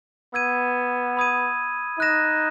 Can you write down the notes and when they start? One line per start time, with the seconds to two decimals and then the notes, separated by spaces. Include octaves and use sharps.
0.34 B3 E6 G#6 D#7
1.17 B5 D#6 G#6 D#7
2.00 D#4 F#6 A#6 E7